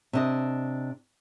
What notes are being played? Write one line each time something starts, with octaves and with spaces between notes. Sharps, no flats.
C3 D4 D#5